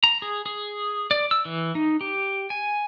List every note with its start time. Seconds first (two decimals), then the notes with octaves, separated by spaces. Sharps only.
0.04 A#5
0.22 G#4
0.46 G#4
1.11 D5
1.31 E6
1.45 E3
1.75 D#4
2.01 G4
2.50 G#5